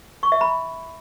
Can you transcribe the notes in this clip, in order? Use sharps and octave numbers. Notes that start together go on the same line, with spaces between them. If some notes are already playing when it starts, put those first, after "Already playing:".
C#6
E5
B5